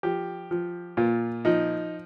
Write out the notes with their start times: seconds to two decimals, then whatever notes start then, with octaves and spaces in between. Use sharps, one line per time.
0.03 F3 G4
0.51 F3
0.97 A#2 F4
1.45 F3 D#4